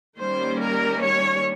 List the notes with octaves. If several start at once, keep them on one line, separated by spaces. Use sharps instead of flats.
D#3 G3 A#3 C#4 C5
A#4
C#5